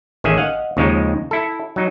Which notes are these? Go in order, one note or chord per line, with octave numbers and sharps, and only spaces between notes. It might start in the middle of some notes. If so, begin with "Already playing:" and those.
A1 D#3 C#4 G#4 E5 G#5
D#5 F5 F#5
D#2 C#3 F3 G#3 D#4
E4 A4
F#3 D#4